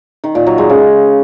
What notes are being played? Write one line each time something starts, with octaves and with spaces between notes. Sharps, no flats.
D#3
A#2
F#3
G#3
C#3